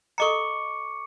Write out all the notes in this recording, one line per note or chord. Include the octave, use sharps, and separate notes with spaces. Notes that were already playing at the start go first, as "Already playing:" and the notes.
A4 D#5 A#5 C#6 D6 C#7